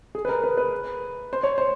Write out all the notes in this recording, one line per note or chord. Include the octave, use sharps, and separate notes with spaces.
G#4
B4
A#4
B4
B4
C5
C#5
C5